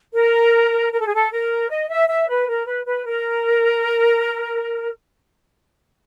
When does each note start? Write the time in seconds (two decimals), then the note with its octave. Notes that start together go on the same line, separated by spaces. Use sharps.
0.14 A#4
0.92 A#4
1.00 A4
1.06 G#4
1.14 A4
1.31 A#4
1.69 D#5
1.89 E5
2.08 E5
2.28 B4
2.48 A#4
2.66 B4
2.86 B4
3.05 A#4